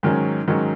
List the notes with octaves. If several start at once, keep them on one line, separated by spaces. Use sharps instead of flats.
G#2 D#3 F#3 C#4
G#2 D#3 F#3 C#4